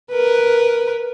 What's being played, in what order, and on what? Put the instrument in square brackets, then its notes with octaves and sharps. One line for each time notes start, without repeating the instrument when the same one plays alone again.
[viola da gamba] A#4 B4